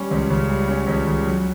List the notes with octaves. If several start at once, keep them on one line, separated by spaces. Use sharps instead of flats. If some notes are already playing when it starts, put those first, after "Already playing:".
Already playing: G3 C#4
C#2
C#3
G3
C#4
C#2
C#3
F#3